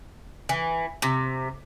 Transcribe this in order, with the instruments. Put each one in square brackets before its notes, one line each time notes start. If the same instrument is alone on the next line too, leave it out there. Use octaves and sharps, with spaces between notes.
[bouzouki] E3
C3